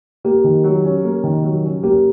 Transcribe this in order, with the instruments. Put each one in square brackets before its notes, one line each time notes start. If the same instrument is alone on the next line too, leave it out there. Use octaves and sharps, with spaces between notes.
[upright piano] A#3 [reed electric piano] G4
[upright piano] D#3
F#3
C#4
A#3
D#3
F#3
C#4
[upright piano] A#3 [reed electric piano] G4